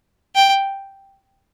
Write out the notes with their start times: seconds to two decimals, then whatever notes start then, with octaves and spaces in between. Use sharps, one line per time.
0.35 G5